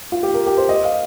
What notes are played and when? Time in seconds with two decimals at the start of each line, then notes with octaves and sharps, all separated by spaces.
0.12 F4
0.23 G4
0.34 A#4
0.46 G4
0.58 C5
0.69 D#5
0.85 F5